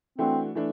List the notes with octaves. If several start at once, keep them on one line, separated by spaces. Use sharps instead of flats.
E3 A3 C4 D4 F#4
E3 A3 D4